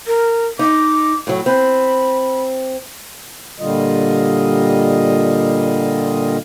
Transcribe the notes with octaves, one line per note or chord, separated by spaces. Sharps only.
A#4
D#4 D6
A2 F#3
C4 B5
A#2 D3 G3 F4 D#5